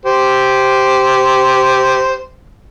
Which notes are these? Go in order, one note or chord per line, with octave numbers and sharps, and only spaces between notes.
G4 C5